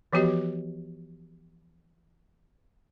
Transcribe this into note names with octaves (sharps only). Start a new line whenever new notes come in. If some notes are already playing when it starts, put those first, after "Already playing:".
E3 F3 B3 F#4 G4 D#5